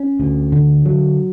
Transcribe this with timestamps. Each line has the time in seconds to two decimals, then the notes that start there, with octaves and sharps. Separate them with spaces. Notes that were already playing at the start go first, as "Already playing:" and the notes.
Already playing: C#4
0.20 D2
0.52 D3
0.86 F#3